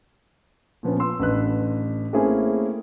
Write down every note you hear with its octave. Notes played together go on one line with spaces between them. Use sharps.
A#2 F3 B3 C#4
C6 E6
A1 D4 B4 F#6
A3 A#3 C4 C#4 E4 G#4